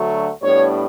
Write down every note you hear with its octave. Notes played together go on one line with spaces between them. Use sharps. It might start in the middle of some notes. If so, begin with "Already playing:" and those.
Already playing: D2 D3 F#3 A3
A2 G3 B3 D4 C#5